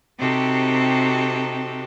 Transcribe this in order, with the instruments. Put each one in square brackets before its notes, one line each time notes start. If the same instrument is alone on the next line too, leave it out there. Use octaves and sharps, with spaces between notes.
[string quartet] C3 C4 D#4 F#4 G4 A4